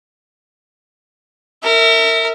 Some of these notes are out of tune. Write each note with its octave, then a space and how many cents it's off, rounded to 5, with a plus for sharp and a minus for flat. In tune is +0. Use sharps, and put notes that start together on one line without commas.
A#4 -35 E5 -15